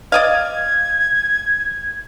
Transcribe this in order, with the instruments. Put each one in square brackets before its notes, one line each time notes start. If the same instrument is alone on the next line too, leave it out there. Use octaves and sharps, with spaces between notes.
[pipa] D5 D#5 F5 [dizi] G#6